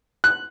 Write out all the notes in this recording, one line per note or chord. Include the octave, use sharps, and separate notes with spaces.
F#6